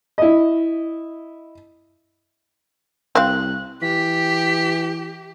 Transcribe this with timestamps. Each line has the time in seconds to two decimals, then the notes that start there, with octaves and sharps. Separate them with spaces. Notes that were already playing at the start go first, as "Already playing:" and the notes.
0.18 E4 D#5
3.15 C2 C4 F5 F#6
3.82 E3 G4 B6